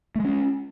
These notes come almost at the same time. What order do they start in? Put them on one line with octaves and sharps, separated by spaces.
A3 G#3 C#4